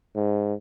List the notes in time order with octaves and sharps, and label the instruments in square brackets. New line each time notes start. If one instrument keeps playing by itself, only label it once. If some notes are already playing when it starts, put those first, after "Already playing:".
[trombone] G#2